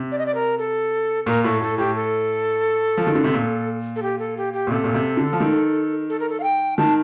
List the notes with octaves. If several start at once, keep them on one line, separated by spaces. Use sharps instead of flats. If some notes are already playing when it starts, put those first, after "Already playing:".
Already playing: C3
D5
D#5
D5
A#4
A4
A#2 A#4
A2 A4
A2 A4
A2 G4
A4
F3
D#3
D3
C3
A#2
A4
G4
A4
G4
G4
A#2
C3 A4
A#2
C3
D3
F3
D#3
A4
A#4
A4
F5
G5
D#3 A5